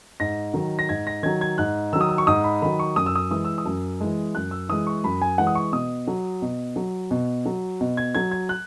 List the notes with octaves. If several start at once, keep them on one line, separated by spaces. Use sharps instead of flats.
G#2 A#6
D#3 F#3
A#6
G#2 G#6
A#6
D#3 F#3 G#6
G#6
G#2 F#6
D#3 F#3 E6
D#6
E6
C#6
G#2 D#6
B5
D#3 F#3 B5
C#6
F#2 D#6
E6
D#6
E3 G#3 D#6
E6
D#6
F#2
E3 G#3
F#2 F#6
E6
E3 G#3 D#6
C#6
F#2 B5
G#5
E3 G#3 F#5
D#6
C#6
B2 D#6
F#3
B2
F#3
B2
F#3
B2
G#6
F#3 G#6
G#6
F#6